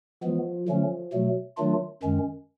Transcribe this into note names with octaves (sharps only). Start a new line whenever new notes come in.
E3 F3 G#3 B3
D3 F3 F#3 A3 C#4
B2 F#3 A3
D#3 F#3 A3 D4 F4
F#2 D#3 G#3 C#4